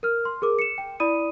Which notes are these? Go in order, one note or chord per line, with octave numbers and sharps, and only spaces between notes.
A#4 F6
C6
G#4 A#4 D6
C#7 E7
G5
E4 D5 B5 D#6 D#7